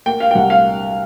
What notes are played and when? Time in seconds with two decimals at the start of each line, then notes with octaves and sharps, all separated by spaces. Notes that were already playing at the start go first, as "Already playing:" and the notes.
0.06 A#3 G5
0.20 F5
0.31 G5
0.35 C2 F#5
0.50 F5